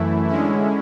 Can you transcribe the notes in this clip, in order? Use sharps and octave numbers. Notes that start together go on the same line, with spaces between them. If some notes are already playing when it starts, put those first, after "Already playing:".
Already playing: F#2 E3 A3 E4
D3 G#3 C#4 E4